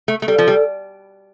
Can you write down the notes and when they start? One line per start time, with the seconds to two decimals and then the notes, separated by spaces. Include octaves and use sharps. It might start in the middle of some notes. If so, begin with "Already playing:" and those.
0.08 A3
0.22 A3
0.27 G3 A4
0.38 F3
0.48 G3